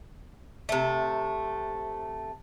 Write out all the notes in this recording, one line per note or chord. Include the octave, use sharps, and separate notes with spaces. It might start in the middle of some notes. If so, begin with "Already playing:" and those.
C3 A3